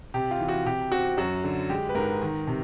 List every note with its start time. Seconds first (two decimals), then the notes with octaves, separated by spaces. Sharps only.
0.14 C3 G4
0.31 F4
0.40 E3
0.48 F#4
0.66 C3 G4
0.92 C4 F#4
1.17 F#2 F#4
1.44 D3
1.69 G#3 G4
1.89 B4
1.95 G#2 A#4
2.22 D#3
2.47 C3